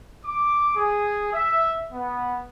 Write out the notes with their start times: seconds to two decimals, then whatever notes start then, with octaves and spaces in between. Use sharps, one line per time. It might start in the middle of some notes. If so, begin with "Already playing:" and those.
0.23 D6
0.76 G#4
1.34 E5
1.93 B3